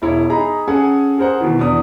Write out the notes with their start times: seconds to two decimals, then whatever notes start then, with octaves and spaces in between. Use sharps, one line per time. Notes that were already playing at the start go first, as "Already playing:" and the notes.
0.02 E1 E4 C#5
0.29 D#4 G#4 A#5 B5
0.68 C#4 G#4 A4 F#5 G#5
1.18 G#4 A#4 C5 F#5
1.40 B2 D#3 E3
1.59 E2 D4 D#6